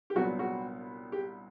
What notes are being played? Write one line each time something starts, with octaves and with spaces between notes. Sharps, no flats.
G4
C2 A#2 F#3 B3 D4 F#4
F#4
G4